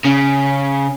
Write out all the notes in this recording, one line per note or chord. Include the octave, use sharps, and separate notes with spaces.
C#3